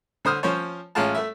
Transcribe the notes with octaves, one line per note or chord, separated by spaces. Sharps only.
D3 C5 D#6 F6
F3 C#4 C5 C#5
A1 G#3 C#4 F4 F5 A5
A3 E5